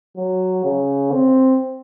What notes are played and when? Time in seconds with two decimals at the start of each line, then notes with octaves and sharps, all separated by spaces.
0.17 F#3
0.64 C#3
1.12 C4